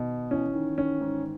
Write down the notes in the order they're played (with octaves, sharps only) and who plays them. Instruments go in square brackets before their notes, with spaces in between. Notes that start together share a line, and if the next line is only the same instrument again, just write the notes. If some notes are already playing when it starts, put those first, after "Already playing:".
Already playing: [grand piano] B2 [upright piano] D#3
[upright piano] E3 [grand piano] C#4
[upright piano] D#3
[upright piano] D#3 [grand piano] C#4
[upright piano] G#2